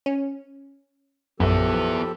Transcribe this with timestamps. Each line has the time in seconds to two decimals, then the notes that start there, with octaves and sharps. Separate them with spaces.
0.06 C#4
1.40 A#1 F#2 F3 B3 E4 G4 A4